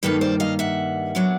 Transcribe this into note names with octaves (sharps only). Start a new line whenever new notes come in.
G2 D#3 G3 A#3 A4 B4
C5 D5
D#5 F5
E5 F#5
A#2 F#3 B3 D4